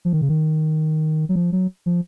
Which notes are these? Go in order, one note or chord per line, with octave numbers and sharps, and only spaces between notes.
F3
D#3
C#3
D#3
F#3
F3
F#3
F3